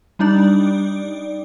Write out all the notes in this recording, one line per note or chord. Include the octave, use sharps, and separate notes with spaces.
G3 D4 D#4 D5